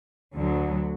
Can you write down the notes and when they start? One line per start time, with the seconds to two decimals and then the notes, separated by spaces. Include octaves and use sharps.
0.34 D2 D3 F#3